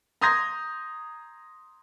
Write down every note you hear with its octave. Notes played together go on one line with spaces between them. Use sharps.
A#5 C6 D#6 G6 G#6 A#6